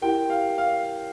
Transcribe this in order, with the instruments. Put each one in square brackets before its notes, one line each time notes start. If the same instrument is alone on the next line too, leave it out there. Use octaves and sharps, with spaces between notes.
[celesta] E4 G4 A#4 [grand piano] G5
[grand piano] F5
F5